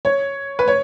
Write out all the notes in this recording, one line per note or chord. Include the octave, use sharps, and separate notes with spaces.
C#5
B4
C#5